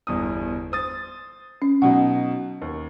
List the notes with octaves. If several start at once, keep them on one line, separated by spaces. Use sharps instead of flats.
G1 E2 D#6
C5 D#6 A6
C#4
B2 F#3 D#4 F#5
D#2